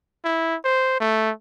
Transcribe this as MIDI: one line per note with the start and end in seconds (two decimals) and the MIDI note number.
0.25 0.55 64
0.64 0.96 72
1.00 1.31 57